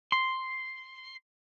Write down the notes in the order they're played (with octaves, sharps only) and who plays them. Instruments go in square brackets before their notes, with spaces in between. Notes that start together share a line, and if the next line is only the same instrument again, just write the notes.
[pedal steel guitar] C6